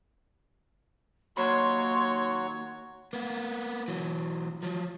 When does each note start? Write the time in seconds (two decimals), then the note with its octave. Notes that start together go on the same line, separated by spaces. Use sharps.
1.37 D#2 F#3 A#3 F#4 C#5 B5 C6
3.13 A#3 B3
3.88 E3 F#3
4.63 F3 F#3